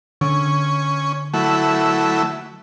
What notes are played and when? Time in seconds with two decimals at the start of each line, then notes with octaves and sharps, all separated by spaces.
0.21 D3 C#4
1.34 F#3 A3 E4